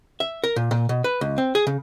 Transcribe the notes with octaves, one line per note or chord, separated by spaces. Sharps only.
E5
A#4
A#2
A#2
B2
B4
C#2
C4
G#4
C#3